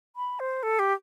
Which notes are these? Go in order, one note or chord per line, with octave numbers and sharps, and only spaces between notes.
B5
C5
A4
G4